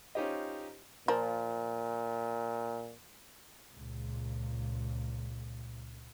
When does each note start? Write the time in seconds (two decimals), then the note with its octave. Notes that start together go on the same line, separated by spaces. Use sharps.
0.15 C#4 D#4 F4 G4 C5 D#5
1.08 A#2 F3 A#4
3.75 C#2 A#2